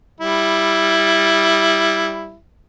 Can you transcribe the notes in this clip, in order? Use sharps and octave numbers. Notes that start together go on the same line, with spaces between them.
G3 E4